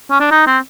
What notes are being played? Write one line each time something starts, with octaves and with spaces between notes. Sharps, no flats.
C#4
D4
D#4
C4